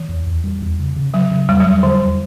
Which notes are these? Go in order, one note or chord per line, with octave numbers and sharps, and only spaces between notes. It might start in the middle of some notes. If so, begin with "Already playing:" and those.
Already playing: E3
E2
E2
G3
E2
C#3
C#3
C#3 F#3
C#3
E2 G3
F#3
E2
D3 G3
E2